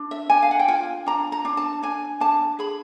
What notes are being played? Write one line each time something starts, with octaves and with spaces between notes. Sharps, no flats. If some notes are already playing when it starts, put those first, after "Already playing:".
Already playing: D4
E5
D4 G#5
F5
F#5
G5
F4 G#5
D4 A#5
A#5
D4
A5
D4 G#5
D4 A5
G#4 B5